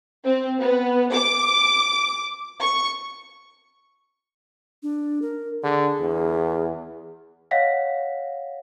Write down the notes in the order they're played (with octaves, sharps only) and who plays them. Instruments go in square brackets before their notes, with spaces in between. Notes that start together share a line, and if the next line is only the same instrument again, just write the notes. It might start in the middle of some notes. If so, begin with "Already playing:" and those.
[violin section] C4
B3
D6
C#6
[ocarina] D4
A#4
[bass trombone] D3 [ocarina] G#4
[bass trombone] E2
[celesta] C#5 D#5 F5 F#5 A#6 B6